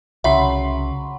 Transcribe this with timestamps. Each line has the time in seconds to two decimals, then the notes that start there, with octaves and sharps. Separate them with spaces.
0.24 C2 C#3 F#3 E5 B5 C6